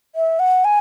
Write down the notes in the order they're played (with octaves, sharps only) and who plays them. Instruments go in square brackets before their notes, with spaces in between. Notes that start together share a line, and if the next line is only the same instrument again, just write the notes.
[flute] E5
F#5
G#5